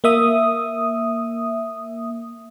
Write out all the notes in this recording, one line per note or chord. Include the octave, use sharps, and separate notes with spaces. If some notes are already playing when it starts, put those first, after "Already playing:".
A#3 E5 D#6